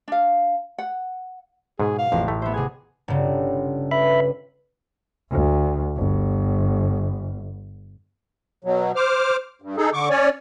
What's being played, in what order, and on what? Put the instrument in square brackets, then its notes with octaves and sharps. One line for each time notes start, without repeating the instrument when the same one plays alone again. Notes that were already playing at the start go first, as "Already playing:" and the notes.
[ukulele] D4 F5
F#5
[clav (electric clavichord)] G#2 [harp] B2 [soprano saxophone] G#4
[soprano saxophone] F5
[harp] A1 [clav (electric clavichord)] F2
[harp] A2 [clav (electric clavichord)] A3
[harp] B3 C5 [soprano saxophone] E5
[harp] C3 G#6 [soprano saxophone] G#4
[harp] G1 C#3
[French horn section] B4 [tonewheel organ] E5 B5
[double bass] D2
G1
[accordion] B2 F#3
C5 D6 F6
G2
D#4 G#4 A4
D3 C#6 D6
C#4 C#5 D5 G#5